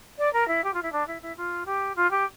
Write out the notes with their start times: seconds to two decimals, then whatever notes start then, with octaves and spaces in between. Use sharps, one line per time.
0.18 D5
0.33 A#4
0.48 E4
0.64 G4
0.74 F4
0.82 E4
0.92 D4
1.07 E4
1.22 E4
1.37 F4
1.66 G4
1.96 F4
2.11 G4